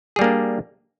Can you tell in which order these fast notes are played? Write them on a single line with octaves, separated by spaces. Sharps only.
G#4 G3 A#3 D4